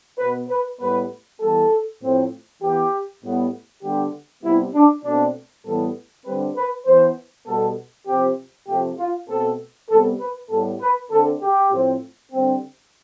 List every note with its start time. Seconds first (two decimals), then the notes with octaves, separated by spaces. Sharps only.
0.18 B2 B3 B4
0.49 B4
0.80 A2 G3 B3 B4
1.40 E3 G3 B3 A4
2.01 A2 F3 A3 C4
2.62 E3 B3 G4
3.23 A2 G3 B3
3.82 D3 G3 B3 G4
4.43 C3 G3 B3 E4
4.74 D4
5.04 B2 A3 C4 D4
5.65 A2 E3 G3 B3 A4
6.25 D3 G3 C4 B4
6.56 B4
6.86 E3 B3 C5
7.47 B2 G3 B3 A4
8.07 C3 F3 C4 G4
8.68 C3 F3 A3 C4 G4
8.98 F4
9.29 B2 A3 C4 A4
9.89 C3 G3 B3 A4
10.20 B4
10.50 A2 G3 B3 A4
10.80 B4
11.10 D3 A3 C4 A4
11.41 G4
11.71 A2 F3 C4
12.32 D3 G3 C4